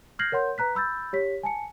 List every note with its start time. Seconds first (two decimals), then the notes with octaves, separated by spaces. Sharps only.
0.19 F6 G6 G#6 A#6 C7 F#7
0.32 A#4 C#5 F#5 C6 G6
0.58 B4 A#5 F#6 B6
0.75 B5 E6 G6 A6
1.13 G4 C#5 B6
1.43 G#5 A5 C#7